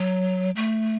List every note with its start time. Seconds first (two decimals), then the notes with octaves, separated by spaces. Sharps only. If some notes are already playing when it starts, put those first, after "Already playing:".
Already playing: F#3
0.56 A3